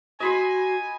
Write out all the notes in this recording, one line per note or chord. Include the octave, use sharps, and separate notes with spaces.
F#4 D#5 G#5 B5 C6